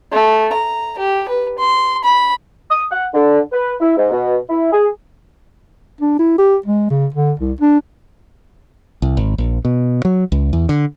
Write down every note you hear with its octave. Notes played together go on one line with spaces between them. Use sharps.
A3
A#5
G4
B4
C6
B5
D#6
F#5
D3
B4
E4
G#2
B2
E4
G#4
D4
E4
G4
G#3
C#3
D3
C2
D4
C2
G#1
A#1
B2
F#3
C#2
E2
D3